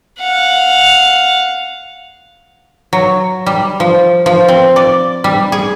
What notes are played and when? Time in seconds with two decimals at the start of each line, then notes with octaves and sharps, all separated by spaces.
0.19 F5 F#5
2.93 F#3
3.46 G3
3.80 F3
4.26 F3
4.48 C4
4.76 D5
5.24 G3
5.52 G#4